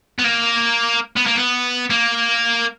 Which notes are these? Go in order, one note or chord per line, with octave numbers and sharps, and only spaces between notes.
B3
A#3
B3
A#3
B3
A#3